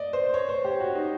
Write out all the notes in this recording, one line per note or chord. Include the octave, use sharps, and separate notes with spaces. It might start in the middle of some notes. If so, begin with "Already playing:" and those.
Already playing: D5 D#5
C5
C#5
C5
G4
F#4
D#4